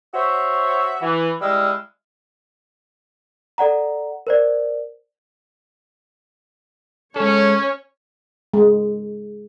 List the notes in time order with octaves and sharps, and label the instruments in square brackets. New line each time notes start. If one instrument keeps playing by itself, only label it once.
[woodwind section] F#4 C5 C#5 E5
E3
G3 G#3 E4 D#5 F5 E6
[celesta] A4 D5 F#5 A#5
A#4 C5 D5
[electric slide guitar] G#3 A4 [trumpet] C#4 [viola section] C#5
[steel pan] G#3